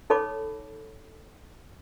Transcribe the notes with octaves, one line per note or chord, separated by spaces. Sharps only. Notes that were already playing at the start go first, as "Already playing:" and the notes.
D#4 A4 C#5 B5 D6